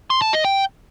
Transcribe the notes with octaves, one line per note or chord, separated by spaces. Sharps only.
C6
A5
D#5
G5